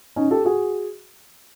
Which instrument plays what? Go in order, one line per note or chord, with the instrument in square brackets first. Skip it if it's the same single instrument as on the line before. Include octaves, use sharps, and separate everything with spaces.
[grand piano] C#4 D#4
G4 A4
F#4 G#4